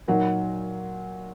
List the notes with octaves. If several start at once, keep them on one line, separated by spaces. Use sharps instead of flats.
A#2 F#3 D#4